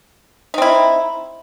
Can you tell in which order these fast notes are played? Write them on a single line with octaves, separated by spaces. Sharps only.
D#4 C4 E4